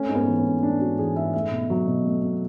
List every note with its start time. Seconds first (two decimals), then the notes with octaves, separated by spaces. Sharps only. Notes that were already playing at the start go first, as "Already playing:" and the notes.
Already playing: A3 C#4
0.09 G#2
0.15 B3
0.27 E3
0.38 C#4
0.46 G#2
0.62 A3 D4
0.80 G#2 F#4
0.99 E3 G#4
1.15 G#2 E5
1.34 A3 E5
1.51 B2
1.70 F#3
1.87 B2
2.05 A3
2.22 B2